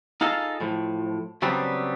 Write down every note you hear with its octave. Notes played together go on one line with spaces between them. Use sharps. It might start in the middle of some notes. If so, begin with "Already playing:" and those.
D#4 F4 G#4 A4 D#5 F5
A2 F3
C#3 F#3 G3 B3 C4 D4